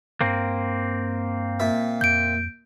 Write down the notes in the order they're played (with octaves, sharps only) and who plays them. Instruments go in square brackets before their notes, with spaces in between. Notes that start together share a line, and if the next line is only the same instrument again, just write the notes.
[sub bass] G2 [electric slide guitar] A#3 C4
[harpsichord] A#2 E5
[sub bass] F2 [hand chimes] G6 D7